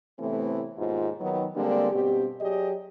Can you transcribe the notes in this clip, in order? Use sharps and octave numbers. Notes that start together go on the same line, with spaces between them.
A2 C3 E3 A3 B3 C4
D#2 G#2 B2 F4
D#3 F#3 B3
D3 G3 G#3 A#3 C4 D4
G2 B2 C4 G4
F#3 G4 G#4 D5 D#5